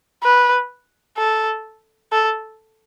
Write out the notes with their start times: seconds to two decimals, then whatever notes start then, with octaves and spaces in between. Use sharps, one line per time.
0.24 B4
1.18 A4
2.12 A4